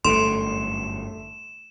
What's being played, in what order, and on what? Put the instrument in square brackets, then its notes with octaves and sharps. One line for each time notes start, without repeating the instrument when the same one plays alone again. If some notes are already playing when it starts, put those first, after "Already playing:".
[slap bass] G1 F#2 A2 [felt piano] A3 D7 [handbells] C6 [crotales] E7